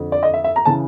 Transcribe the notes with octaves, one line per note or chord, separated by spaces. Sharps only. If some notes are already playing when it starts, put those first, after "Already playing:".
Already playing: F2 D3
D5
D#5
E5
E5
A#5
C#3 E3 A5